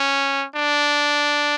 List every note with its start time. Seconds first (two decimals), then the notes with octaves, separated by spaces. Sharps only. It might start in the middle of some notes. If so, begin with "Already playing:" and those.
Already playing: C#4
0.56 D4